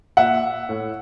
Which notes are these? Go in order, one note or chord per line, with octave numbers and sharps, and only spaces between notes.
A#2 E5 F#5
A2